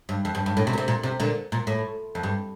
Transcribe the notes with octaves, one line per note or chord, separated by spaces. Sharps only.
G2
F2
G2
G2
A2
C3
A#2
C3
A#2
C3
A#2 D3
A#2
A2
F2
G2